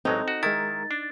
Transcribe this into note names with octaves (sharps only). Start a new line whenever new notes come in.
A1 F#3 G#3 C4 D#4 A4
F#4
D#3 G#3 E4 A#4 A#5 A6
D4